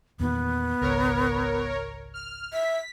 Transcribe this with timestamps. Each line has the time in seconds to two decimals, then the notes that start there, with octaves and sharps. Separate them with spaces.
0.20 E2 A#2 D#3 B3
0.81 G#1 C#2 A#4 C#5
2.14 F6
2.53 E5 B6